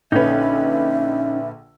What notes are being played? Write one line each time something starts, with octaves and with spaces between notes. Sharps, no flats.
A#1 D3 C#4 D#4 B4 E5